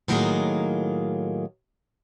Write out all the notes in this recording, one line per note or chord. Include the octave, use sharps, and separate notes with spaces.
A2 D#3 F#3 A#3 F4 G#4